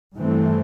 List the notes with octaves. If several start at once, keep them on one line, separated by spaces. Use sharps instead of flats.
G2 E3 A3 C4